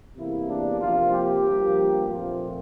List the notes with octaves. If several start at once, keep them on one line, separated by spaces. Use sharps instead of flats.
E2 C3 E3 A#3 E4
D4
C3 F3 A#3 F4
G4
G2 F3 A#3
A#2 F3 A3 C4 F4